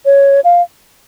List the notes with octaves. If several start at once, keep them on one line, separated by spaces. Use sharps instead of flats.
C#5
F5